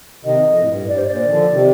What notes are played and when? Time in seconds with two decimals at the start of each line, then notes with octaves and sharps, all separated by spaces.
0.25 C3 D#3 D#5
0.46 F2
0.61 A2
0.68 G2
0.83 A2
0.88 G2 D5
0.98 C5
1.07 A#2 D5
1.26 D#3
1.31 D3 F3
1.52 C3 D#3